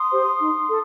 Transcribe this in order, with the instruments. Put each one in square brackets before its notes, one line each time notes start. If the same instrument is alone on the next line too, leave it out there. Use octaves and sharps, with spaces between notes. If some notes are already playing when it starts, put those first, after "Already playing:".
Already playing: [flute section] C6 D#6
G4 C5
D#4
A4